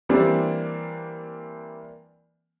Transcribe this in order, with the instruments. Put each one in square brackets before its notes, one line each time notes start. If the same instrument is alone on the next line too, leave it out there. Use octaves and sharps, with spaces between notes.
[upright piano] E3 G3 A#3 C4 D4